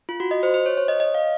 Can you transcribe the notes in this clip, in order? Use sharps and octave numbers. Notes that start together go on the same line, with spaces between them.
F4
F#4
D#5
C5
C5
C#5
C#5
D#5
D#5
F5